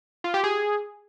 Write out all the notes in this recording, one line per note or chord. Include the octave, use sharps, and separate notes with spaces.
F4
G4
G#4